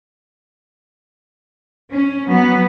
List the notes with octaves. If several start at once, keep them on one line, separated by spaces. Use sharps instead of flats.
C#4
F#3 B3